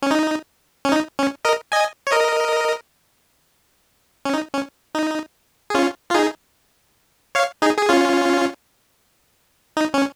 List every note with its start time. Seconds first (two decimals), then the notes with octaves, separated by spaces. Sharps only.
0.02 C#4
0.11 D#4
0.85 C#4
0.92 D#4
1.19 C#4
1.45 A#4 D#5
1.72 D#5 G#5
2.07 C#5
2.12 A#4 D#5
4.25 C#4
4.34 D#4
4.54 C#4
4.95 D#4
5.70 G#4
5.74 C#4 F4
6.11 F4
6.14 D#4 G#4
7.35 C#5 F5
7.62 D#4 G#4
7.78 G#4
7.89 C#4 F4
9.77 D#4
9.94 C#4